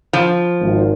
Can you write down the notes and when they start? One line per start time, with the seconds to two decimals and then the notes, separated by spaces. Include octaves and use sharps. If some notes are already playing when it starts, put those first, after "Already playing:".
0.13 F3
0.61 G#1